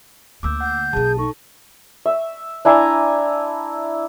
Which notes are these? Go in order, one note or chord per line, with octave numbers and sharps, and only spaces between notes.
D2 A#3 D6 E6 G6
F#5 G6
B1 A#3 G#4 A5
D#4 A4 C#6
E5
D4 E4 G#5 A#5